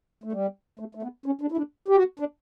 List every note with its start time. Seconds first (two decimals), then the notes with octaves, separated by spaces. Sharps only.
0.24 A3
0.32 G3
0.79 A3
0.95 A3
1.03 B3
1.26 C#4
1.41 D4
1.52 E4
1.57 D4
1.88 G4
1.96 F#4
2.20 D4